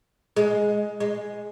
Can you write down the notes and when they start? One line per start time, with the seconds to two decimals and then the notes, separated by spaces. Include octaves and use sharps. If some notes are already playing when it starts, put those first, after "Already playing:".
0.36 G#3
1.00 G#3